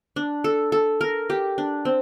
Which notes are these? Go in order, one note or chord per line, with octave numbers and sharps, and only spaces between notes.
D4
A4
A4
A#4
G4
D4
C4